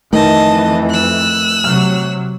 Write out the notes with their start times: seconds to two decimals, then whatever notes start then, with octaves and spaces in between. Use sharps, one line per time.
0.13 F2 D#3 E3 A3 D#5 A5
0.90 E6 F#6
1.64 C3 F#3 F6